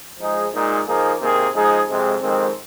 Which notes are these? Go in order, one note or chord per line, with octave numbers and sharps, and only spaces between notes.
F3 G#3 D#4 G#4
A#2 G#3 D#4
F3 A#3 D#4 G#4
C3 D#3 A#3 G#4
F3 G#3 D#4 G#4
F2 C3 G#3
F2 D#3 G#3 C4